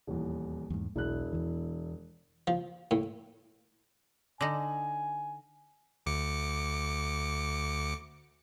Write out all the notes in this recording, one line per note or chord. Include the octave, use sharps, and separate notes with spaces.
D#1 E2
E2 G#2
E1 B1 E4 F#6
E2 E3
F3
A2
D3 D#4 G#5
D2 D6 C#7